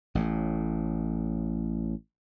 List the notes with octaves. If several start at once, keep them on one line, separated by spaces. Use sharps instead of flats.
A1 A2